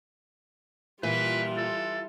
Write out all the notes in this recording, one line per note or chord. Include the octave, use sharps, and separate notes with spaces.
A#2 E3 G3 F4 B4
A4